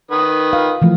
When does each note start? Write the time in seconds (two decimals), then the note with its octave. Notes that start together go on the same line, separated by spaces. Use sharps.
0.11 D#3 B4 D#6
0.53 F5
0.82 E3 F3 A3